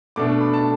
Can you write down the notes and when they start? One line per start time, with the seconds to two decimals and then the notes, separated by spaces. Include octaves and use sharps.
0.16 B2 A3 D4 D6
0.41 B5
0.54 A5